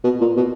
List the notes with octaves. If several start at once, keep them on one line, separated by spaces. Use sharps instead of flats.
B2
A#2
B2